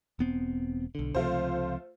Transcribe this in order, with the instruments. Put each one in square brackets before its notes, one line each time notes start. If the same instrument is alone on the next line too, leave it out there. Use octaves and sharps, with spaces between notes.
[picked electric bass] E1 B3 C4
B1 D3
[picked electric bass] C#2 C3 F3 [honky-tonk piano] A3 F4 C5